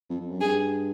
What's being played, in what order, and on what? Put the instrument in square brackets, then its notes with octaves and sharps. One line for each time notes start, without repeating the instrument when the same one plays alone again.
[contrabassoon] F2
F2
F#2
[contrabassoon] G2 [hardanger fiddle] G#4